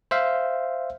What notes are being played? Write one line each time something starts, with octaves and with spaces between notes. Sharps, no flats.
C5 E5 F5